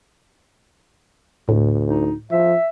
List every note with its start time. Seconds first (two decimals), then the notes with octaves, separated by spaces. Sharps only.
1.49 D2 A2
1.88 D#4
2.31 F3 E5